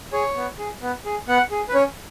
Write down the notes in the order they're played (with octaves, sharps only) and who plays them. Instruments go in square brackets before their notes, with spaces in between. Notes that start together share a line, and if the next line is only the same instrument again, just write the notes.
[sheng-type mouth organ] G#4 C#5
B3
G#4
B3
G#4
B3 F#5
G#4
B4
C#4 C#5